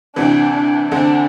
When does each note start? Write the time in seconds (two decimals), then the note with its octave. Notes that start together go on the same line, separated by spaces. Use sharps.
0.16 D2 C3 E3 D4
0.54 D4
0.91 D2 D3 C4 D4 A4